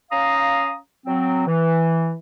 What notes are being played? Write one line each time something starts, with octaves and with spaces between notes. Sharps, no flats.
C#4 F5 A#5 D#6
F#3 C4
E3